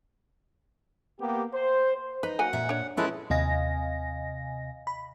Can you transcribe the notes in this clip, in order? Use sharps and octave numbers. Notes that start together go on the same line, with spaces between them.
A#3 B3 G4
C5
D#4 B4
F#3 A#3 F#5 G#5
A#2 E5
D4 C#5
G#3 C#4 E4 G#4 A4 B4
D#2 C3 D#5 F5 G#5 A#6
B5